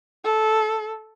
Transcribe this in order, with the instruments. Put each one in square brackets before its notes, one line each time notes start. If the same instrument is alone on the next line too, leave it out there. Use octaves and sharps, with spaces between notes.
[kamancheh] A4